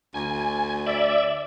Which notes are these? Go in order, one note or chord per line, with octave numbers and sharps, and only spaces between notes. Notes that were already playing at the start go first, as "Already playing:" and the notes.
D2 G#5
D5 E5